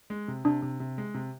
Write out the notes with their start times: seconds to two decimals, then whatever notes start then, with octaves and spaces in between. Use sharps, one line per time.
0.10 G#3
0.28 C3
0.45 C3 D4
0.62 C3
0.80 C3
0.98 G#3
1.14 C3